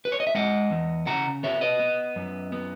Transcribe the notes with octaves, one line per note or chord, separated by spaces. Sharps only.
B4
C#5
D#5
E5
G#3 D#5 F#5
E2
C#3 F#5 A#5
B3 C#5 E5
B4 D#5
B3
F#2
B3